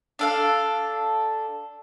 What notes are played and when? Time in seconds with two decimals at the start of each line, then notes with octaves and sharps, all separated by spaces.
0.19 D4 A4 F5